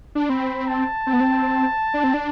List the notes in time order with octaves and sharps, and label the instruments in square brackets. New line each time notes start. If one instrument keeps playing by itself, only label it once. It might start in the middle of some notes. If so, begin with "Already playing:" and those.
[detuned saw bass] D4
[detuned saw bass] C4 [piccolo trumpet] B5
[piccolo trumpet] A5
[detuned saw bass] C4
B3
C4
D4
C4
D4